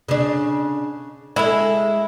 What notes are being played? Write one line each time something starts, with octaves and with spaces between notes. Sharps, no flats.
C#3 D4
G#3 E4 A4